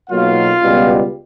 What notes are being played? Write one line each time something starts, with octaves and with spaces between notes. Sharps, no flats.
B1 B2 F#3 A#3 F4 F5
C#2 B2 G3 B3